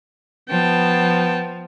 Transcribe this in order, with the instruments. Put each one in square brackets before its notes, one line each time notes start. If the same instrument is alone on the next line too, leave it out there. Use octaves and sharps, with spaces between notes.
[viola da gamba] F3 [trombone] B3 [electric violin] G5 A5